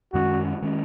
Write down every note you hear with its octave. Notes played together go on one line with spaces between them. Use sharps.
F#2 D#3 G#3 C#4 F#4
D#3 G#3 C#4